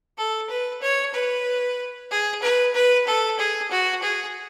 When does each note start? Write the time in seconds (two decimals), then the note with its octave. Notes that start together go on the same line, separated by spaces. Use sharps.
0.18 A4
0.50 B4
0.82 C#5
1.14 B4
2.11 G#4
2.42 B4
2.74 B4
3.07 A4
3.39 G#4
3.71 F#4
4.03 G#4